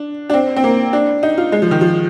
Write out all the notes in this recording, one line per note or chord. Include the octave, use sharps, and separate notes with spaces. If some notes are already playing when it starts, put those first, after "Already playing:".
Already playing: D4
D4
C4
C4
A#3
D4
D#4
F4
G#3
F3
D#3
F3